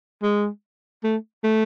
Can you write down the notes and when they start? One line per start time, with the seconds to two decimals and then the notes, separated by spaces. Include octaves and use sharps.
0.23 G#3
1.04 A3
1.44 A3